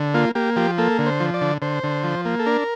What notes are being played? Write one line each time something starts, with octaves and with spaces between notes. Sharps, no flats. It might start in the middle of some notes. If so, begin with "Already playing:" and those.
Already playing: D3
A#3 F4
A#3 G4
F3 G4
A#3 A4
D3
C5
F3
D5
D3
D3 C5
D3
F3
A#3
A4
D4 A#4